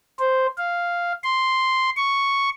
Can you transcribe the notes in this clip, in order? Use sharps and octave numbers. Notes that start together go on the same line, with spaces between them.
C5
F5
C6
C#6